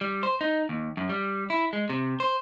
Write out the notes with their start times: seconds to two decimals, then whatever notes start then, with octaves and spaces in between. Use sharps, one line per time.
0.01 G3
0.23 C5
0.41 D#4
0.69 D#2
0.97 F#2
1.09 G3
1.50 E4
1.73 G#3
1.90 C3
2.20 C5